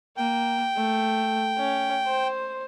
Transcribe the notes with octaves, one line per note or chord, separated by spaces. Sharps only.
A#3 G5
A3
C#4
C5